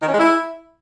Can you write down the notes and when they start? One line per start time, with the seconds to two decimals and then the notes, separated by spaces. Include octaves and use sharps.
0.02 D#3
0.08 C#4
0.13 G#3
0.18 E4